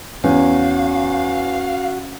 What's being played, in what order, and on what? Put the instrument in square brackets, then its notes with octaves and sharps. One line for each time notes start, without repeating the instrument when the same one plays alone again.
[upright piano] E2 [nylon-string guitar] C#4 [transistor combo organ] F#4 [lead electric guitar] F5